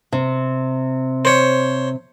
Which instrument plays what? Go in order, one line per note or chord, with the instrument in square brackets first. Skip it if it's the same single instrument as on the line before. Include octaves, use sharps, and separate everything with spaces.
[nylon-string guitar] C3
[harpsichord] C5 C#5